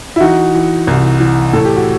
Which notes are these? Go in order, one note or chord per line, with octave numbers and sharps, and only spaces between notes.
E4
E3 D#4 F#4
E3
C2
E3
A2 A4
G4
F#4